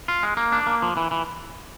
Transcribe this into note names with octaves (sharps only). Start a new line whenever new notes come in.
F4
G#3
A#3
D4
A#3
F3
E3
E3